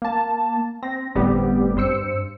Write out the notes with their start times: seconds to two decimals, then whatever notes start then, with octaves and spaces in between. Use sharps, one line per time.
0.02 A#3 A5
0.82 C4 A#6
1.15 G1 A2 G3 B3 C4 G4
1.77 G2 C5 E6 C#7